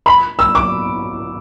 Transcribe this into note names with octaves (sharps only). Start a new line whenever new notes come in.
B5
E6
D6